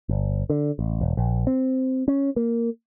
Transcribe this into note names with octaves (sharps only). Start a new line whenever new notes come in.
G1
D3
A1
E1
A#1
C4
C#4
A#3